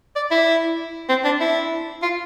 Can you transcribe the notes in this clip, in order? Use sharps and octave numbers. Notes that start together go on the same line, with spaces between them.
D5
E4
C4
D4
E4
F4